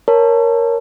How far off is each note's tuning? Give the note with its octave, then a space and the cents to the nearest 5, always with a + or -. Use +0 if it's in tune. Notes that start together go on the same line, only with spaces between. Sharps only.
A#4 +0 C#5 +0 A5 +0